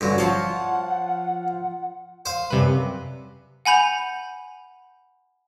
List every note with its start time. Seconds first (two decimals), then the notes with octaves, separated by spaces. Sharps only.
0.01 G2 D3 F#3 C#4
0.18 F3 F4 C#5 F#5 A5
2.26 C5 F5
2.50 F#2 C3 G3 B4
3.65 F#5 G#5 B5 G6 F7